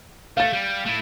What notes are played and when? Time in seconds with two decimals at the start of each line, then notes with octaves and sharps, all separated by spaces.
0.37 A3 F5 A6
0.53 G3
0.85 A3 E4